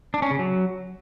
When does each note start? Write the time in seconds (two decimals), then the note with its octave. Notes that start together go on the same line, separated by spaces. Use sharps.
0.14 D4
0.22 C#4
0.31 C#3
0.39 F#3